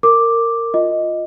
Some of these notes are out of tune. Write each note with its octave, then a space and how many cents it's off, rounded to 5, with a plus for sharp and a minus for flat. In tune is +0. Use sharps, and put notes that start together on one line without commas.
A#4 -20 D6 +0
F4 +10 D#5 +0